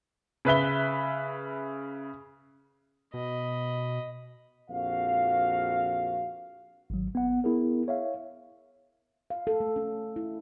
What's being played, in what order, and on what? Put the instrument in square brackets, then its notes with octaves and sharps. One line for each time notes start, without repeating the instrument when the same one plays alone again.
[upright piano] C#3 B4 E5 G7
[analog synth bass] B2 [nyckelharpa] D#5 B5
[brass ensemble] A#1 F2 F#4 F5
[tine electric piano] G#1 F#3
B3 F#5
B3 E4 G#4 A#4
C#5 E5 F5
[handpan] F5
A4
A3
C#4
E4